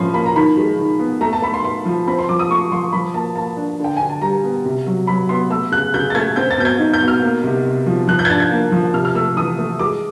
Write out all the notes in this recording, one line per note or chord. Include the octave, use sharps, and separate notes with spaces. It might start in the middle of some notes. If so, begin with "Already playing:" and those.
Already playing: A2 F3 C#4 B5 C6
A#3 B5
A#5
D#3 B5
G#3
D#3
B3
A3 A#5
A5
A3 B5
C6
A3 C6
F3
C4 B5
C6
F3 D6
D#6
A3 C#6
F3 C6
F3 B5
A#3 A5
A#3 A5
D4
D3 G5
D3 G#5
A5
G3 A#5
B3
C3
F#3
F#3 B5
B3 C6
A3 E6
C#3 F#6
C#3 G6
A6
A3 G#6
C4 G6
A6
B2 G6
G#6
D#4
G6
B2
F6
A#3
C3
C3
F3
F3 F#6
G6
G#6
D4 A6
G#6
A#3
F3
C3 F6
F6
A3 E6
E3 D#6
A3
G#3 D6